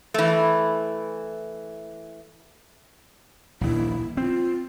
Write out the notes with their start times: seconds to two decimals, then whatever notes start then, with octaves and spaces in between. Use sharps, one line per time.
0.14 E3 A3
3.61 A#1 D#2 E4
4.17 C4 F4